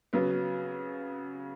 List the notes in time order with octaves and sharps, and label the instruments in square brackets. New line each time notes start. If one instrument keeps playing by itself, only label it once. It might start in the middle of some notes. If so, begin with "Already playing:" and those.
[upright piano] C#3 F#3 B3